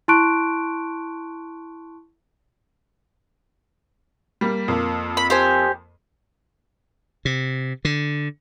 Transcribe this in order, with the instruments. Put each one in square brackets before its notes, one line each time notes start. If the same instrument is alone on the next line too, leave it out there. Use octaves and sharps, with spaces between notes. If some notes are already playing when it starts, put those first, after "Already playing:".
[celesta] E4 A5 C6 C#6 F#6 D7
[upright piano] G3 A#3
F2 A#3
[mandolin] B5
G4 C5 G#5
[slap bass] C3
D3